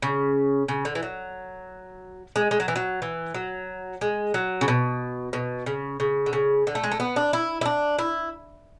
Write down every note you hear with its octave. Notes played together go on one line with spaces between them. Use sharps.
C#3
C#3
D3
E3
F#3
G#3
G#3
F#3
E3
F#3
E3
F#3
G#3
F#3
C#3
B2
B2
C#3
C#3
D3
C#3
D3
A3
G#3
A3
B3
D4
E4
E4
D4
E4